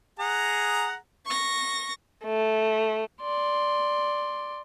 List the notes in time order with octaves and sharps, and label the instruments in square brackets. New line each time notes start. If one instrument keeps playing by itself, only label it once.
[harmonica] G#4 F#5 A#5
[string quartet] C#6 A#6
[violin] A3
[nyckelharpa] D5 C6